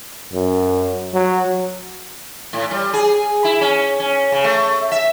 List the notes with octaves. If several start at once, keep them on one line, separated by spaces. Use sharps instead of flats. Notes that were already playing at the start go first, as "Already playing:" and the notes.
F#2
F#3
A2
G3
G#4
E4
C#4
C#4
C#3
A3
E5